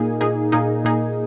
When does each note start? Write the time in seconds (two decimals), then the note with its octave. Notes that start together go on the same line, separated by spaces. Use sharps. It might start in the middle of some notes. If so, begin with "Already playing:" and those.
Already playing: A#2 A#3 D#4 G#4
0.21 A#2 A#3 D#4 G#4
0.52 A#2 A#3 D#4 G#4
0.84 A#2 A#3 D#4 G#4